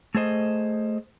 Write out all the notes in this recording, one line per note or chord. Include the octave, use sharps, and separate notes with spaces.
A3 G#4 C5 D#5